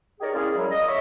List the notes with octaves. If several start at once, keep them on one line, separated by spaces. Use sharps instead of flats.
D#4 G4 G#4 A#4 C#5 D5
G#3 A#3 C#4 E4 G#4
F#2 F#3 G3
D#5
C#5 E5